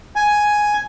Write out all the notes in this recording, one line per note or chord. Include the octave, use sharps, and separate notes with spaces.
G#5